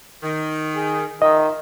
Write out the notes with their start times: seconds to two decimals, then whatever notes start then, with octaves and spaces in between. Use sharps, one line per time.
0.22 D#3
0.76 G#4
1.22 D#3 F4 C5 D#5 E5